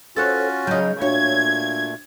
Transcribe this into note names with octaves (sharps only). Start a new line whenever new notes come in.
C#4 F4 F#4 A4 C5 C#5 F#6 A6
C#3 F#3 D#4 G6
A#2 A3 D4 F#4 C#5 F5 G#6